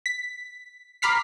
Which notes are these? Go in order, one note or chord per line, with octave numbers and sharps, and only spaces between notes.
B6
A#5 B5 D6 F6 B6 C7